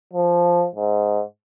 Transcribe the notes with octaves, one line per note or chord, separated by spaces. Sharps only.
F3
G#2